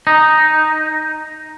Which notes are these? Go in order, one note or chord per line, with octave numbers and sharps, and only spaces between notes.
D#4